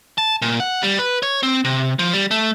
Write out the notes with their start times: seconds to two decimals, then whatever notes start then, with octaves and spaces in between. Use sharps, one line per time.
0.18 A5
0.42 A#2
0.60 F#5
0.83 G3
0.99 B4
1.23 C#5
1.43 C4
1.64 C3
1.99 F3
2.13 G3
2.31 A3